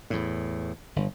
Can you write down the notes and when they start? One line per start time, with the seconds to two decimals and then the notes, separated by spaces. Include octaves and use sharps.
0.10 E2 A2
0.96 G1